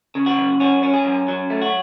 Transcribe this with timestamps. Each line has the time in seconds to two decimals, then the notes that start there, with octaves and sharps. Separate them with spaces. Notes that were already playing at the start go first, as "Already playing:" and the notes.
0.15 C#3
0.26 F#4
0.38 F#2
0.60 C#4 F#4
0.83 C#4
0.94 G#4
1.05 F#2
1.28 F#3
1.50 A3
1.62 F#4